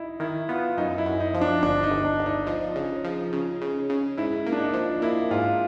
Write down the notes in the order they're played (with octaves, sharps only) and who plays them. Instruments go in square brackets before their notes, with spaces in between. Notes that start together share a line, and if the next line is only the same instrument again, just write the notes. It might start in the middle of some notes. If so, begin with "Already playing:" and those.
Already playing: [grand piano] D#4 E4
[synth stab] D#3 [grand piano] E4
[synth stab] B3 [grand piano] F4
[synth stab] F#2 [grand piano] D#4
[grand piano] E4
[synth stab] F#2
[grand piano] D#4
[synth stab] F3
[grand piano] D4
[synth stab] G1 [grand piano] D4
[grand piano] D#4
[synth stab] G1
[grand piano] D4
[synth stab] G1
[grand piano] D#4
[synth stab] F3
C#3
F3
C#3
C#3
C#3
[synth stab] G#2 [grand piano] E4
[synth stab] A#3
[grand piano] D4
D#4
[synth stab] F3
[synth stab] A#3 [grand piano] E4
[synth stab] G#2 [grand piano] F4